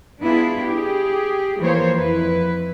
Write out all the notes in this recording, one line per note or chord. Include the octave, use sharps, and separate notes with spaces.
B3 D4 E4 F4 G#4
G4 G#4
E3 F3 A#3 C5 C#5
F2 E4 B4